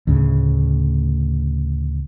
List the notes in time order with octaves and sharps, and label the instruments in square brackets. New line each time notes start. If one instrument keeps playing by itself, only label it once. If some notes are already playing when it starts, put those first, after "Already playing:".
[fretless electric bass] D2 A2 C#3